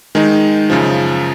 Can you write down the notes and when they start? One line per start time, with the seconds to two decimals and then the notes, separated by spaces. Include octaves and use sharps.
0.15 D#3 G#3 D#4
0.70 F#2 C#3 F3